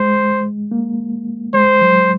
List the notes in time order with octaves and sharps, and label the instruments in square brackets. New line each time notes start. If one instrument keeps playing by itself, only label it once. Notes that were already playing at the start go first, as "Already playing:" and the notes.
Already playing: [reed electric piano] G#3 [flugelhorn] C5
[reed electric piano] A#3
[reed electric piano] G#3 [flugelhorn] C5
[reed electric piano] F#3